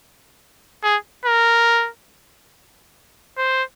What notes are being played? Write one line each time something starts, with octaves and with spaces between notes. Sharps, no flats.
G#4
A#4
C5